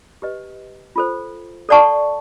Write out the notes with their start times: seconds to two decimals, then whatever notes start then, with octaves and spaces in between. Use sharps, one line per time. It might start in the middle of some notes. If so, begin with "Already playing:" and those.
0.22 G4 B4 D#5
0.96 F4 A4 C5
1.69 A4 D5 F#5 A5 C#6